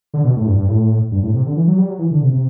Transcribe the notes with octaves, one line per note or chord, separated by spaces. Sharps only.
D3
B2
A2
G2
G2
A2
G2
A2
C3
D3
E3
F#3
G3
F#3
E3
D3
C3
C3